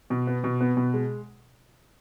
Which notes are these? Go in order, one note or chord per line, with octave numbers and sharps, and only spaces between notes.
B2
B3
B2
B3
B2
G#3